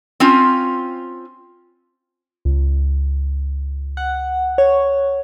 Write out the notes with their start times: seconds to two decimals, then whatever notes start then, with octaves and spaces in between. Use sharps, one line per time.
0.20 C4 C#4 F4
2.45 C#2
3.97 F#5
4.58 C#5